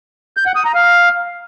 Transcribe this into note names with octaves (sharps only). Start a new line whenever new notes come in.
G6
F#5
D#6
A#5
F5